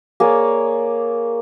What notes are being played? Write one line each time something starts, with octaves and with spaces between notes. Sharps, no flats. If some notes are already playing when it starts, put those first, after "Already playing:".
A#3 G#4 C#5 D5